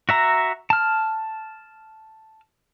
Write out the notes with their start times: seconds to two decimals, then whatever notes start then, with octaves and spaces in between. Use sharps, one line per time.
0.09 F#4 E5 A#5
0.70 A5 F6